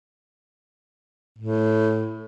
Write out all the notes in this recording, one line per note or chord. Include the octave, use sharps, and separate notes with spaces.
A2